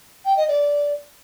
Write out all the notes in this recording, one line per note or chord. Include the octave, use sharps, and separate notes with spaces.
G5
D#5
D5